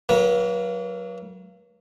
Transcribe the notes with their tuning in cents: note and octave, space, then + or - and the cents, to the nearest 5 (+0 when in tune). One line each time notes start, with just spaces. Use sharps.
F#3 +0 A#3 -30 B4 -40